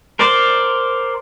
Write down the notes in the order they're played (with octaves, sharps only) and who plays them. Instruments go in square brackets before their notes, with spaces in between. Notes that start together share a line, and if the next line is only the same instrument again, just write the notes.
[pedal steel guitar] A#4 C5 D5